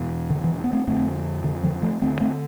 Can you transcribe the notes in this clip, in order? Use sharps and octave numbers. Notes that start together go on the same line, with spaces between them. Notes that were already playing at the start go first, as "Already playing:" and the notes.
Already playing: E2 B2
D3
E3
B3
A3 C4
F2 D3 A3 C4
D3
D3 F3
F3 A3
D2 D3 A3 C4
A3 C4